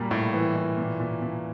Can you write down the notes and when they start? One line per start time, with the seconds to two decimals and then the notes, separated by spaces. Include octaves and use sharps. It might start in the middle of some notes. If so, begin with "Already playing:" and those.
Already playing: A#2 G3 A#3
0.11 A2
0.33 E3
0.56 A2
0.78 A#2
1.00 A#2
1.22 A#2